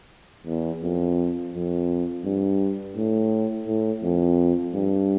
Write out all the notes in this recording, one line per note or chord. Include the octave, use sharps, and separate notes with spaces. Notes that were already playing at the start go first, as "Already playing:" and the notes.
E2
F2
F2
G2
A2
A2
F2
G2